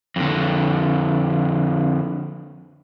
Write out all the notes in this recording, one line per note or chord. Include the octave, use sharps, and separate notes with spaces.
F2 D3